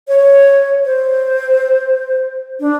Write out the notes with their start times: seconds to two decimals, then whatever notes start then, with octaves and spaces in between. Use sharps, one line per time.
0.08 C#5
0.85 C5
2.60 D4